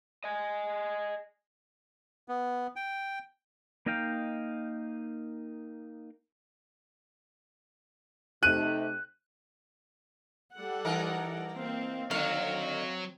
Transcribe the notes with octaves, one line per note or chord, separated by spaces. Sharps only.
D#5 G#5
B3
G5
A#3 D#4 D#5 F5 G5
C3 A3 D#4 F#6 D#7
G3 A4 F#5
E3 D#4 A#4
A#3 C4 F5
D3 D#3 F#3 C4 F5